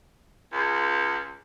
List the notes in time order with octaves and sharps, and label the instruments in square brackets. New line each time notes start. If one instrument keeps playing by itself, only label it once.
[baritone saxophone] C#2